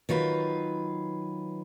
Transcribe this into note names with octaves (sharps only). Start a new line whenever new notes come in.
D#3 F#3 F4 B4